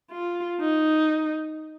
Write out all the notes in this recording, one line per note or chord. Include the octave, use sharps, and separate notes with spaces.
F4
D#4